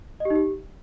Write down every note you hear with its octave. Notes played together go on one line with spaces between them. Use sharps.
D#5
G4
D#4
G4